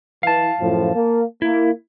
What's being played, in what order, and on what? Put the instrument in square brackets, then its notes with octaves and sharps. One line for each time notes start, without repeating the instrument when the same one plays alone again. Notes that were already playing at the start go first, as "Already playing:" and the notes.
[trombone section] E3 [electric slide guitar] F5 A5
[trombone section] F#2 A2 F3
A#3
[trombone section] A#3 [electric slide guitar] E4